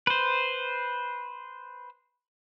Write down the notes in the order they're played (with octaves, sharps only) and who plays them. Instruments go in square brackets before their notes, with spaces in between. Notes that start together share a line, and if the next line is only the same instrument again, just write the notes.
[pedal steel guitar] B4 C5